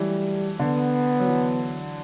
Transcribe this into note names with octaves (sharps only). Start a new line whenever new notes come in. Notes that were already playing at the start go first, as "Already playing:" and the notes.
Already playing: E3 F#3 G3 A3
D3 B3
F#3
E3